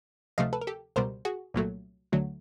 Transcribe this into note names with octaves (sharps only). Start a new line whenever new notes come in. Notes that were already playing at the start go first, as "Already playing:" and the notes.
D2 C3 F3 A3 D#5 F5
A4 B4
A#4
G4 A4
C#2 B2 G3 A#4 C5
F#4 G#4
C2 A#2 F#3 A3
D2 D3 F#3 A3